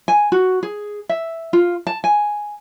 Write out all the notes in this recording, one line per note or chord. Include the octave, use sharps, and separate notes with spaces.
G#5
F#4
G#4
E5
F4
A5
G#5